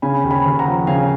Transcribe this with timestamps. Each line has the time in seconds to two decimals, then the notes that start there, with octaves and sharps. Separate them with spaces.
0.02 C#3 G#5 B5
0.24 D#2
0.31 G#5 B5
0.45 D#2
0.59 F#5 A#5
0.66 F3
0.87 C#3 F5 G#5